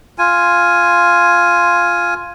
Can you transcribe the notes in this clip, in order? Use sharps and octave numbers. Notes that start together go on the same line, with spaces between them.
F4 G#5